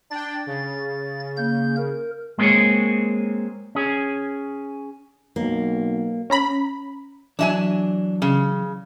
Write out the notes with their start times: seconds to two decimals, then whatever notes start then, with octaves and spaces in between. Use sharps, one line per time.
0.10 D4 G5 A6
0.47 C#3
1.37 A#3 G6
1.77 A#4
2.38 G#3 A#3 C4 G#4 C#5
3.75 C#4 G#4
5.36 B1 A#3
6.30 C#4 A#5 B5
7.39 E3 F#3 D4 E5 G#5
8.22 C#3